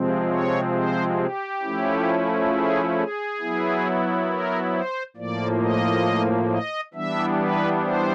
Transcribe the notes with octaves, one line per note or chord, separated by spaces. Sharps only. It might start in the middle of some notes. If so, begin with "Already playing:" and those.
Already playing: C3 F3 G#3 C4
C#5
C5
G4
F3 A3 C#4 E4
G#4
G#4
F#3 B3 E4
A#4
C5
A2 F3 A#3 D5
D#5
D#5
E3 G3 B3 D4 E5
B4
C5